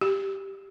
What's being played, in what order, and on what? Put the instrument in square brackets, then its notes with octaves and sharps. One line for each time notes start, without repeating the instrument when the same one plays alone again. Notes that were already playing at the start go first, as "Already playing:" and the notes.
[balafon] G4